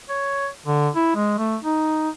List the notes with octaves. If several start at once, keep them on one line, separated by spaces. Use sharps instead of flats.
C#5
D3
E4
G#3
A3
D#4